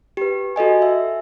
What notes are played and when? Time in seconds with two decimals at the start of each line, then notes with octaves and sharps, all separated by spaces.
0.17 G4 B4
0.56 F#4 A4 D#5 G#5
0.82 E5